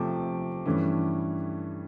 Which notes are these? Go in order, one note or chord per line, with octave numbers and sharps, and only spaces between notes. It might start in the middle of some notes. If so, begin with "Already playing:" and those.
Already playing: C3 F3 A3 D6
G2 E3 A3 C#4